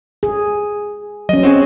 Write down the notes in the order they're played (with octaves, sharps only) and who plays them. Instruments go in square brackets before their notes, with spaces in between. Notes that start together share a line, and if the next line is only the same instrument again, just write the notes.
[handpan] G#4
[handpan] F#3 C#4 [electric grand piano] D#5
[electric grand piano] C4 F#4 G#4